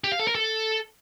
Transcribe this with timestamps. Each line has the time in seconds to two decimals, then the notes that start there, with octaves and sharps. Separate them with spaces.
0.04 G4
0.12 F5
0.20 A4
0.27 A#4
0.35 A4